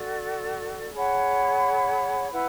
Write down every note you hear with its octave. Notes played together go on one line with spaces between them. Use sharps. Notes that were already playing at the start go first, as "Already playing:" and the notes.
Already playing: F#4 A4 D5
G#4 C#5 F#5 B5
E4 B4 F#5